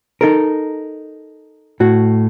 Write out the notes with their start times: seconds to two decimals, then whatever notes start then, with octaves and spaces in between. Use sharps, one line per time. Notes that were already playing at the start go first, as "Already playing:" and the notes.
0.21 D#4 A4 A#4
1.80 A2 F#4